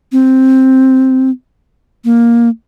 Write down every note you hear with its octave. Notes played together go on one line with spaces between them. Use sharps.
C4
A#3